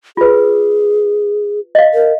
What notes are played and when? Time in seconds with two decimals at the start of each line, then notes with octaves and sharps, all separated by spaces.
0.17 F4 G#4 B4
1.75 D#5 F5
1.94 A#4